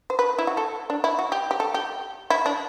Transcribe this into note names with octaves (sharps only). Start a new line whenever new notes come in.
C5
B4
E4
F#4
A4
D4
E4
F#4
G4
G4
A4
G4
E4
D4